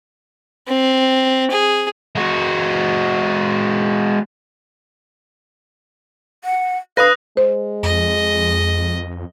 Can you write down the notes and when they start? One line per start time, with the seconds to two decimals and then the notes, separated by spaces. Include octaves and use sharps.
0.68 C4
1.51 G#4
2.16 G#3 F#4
6.44 F#5
6.97 B4 F5 D#6 F#6 A#6
7.37 G#3 C5
7.83 F2 D#5